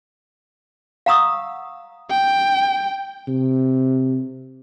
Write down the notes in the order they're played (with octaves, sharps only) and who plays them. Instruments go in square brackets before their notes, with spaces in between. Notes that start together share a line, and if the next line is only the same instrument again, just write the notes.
[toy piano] F5 F#5 A#5 C#6 D#6 E6
[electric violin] G5
[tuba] C3